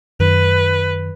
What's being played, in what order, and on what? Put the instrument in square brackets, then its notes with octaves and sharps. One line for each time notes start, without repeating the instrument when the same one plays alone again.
[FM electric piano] F#2 D#3 [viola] B4